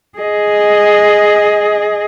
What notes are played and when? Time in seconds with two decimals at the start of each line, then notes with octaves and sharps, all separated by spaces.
0.19 G#4 D#5